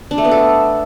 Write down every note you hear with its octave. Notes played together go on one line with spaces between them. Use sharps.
D4
A3
B3
A4